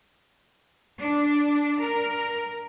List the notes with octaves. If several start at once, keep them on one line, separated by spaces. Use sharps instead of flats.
D4
A#4